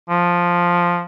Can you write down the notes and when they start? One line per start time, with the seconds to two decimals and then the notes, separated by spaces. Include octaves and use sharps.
0.10 F3